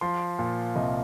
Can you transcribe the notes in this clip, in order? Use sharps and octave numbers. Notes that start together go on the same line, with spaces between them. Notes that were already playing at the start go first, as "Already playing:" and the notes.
F3 C6
A#2
C2 D#5